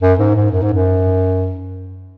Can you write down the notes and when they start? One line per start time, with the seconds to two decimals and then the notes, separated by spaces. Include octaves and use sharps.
0.02 F#2
0.19 G#2
0.35 G#2
0.51 F#2
0.62 G#2
0.73 F#2